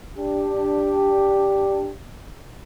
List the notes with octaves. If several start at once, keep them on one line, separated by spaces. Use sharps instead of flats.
D4 G4